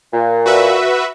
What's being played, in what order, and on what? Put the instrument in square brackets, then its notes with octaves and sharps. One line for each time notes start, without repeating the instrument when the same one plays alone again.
[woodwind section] A#2
[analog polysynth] F#4 B4 E5